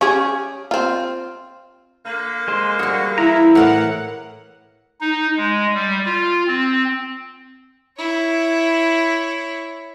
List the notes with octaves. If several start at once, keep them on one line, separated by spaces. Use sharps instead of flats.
C#4 G4 G#4
C4 F4
D3 A#3
G#3 G#4 C5
G3 F#4 G#4
E3 E4 A#5
A2 A#4 F5 F#5
D#4
G#3
G3
F4
C4
E4 C#5